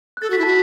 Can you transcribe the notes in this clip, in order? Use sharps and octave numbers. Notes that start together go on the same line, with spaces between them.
F#6
A4 A6
F#4 B6
E4
F#4 A5